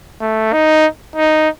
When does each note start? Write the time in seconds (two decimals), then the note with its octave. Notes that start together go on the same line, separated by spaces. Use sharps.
0.21 A3
0.53 D#4
1.16 D#4